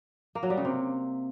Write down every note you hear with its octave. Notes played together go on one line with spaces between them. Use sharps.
A#3
F#3
G3
C#3
C3